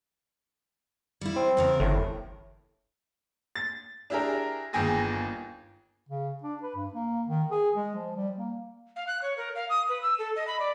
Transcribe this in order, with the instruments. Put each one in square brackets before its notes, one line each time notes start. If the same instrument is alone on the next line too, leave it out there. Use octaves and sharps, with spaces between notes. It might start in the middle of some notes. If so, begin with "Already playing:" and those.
[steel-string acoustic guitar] G3 E4
[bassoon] C4
[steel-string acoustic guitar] E2 C#3 A#4
[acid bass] G1 [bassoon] A2
[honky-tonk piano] A6
D4 E4 G4 G#4 A#4
G1 D#2 G#4 G5 G#5 A#6
[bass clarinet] C#3
D4
B4
G2
A#3
D#3
G#4
G#3
F3
G3
A#3
[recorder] F5
F#6
C#5
A#4
F5
D#6
B4
E6
A4
D#5
B5
D5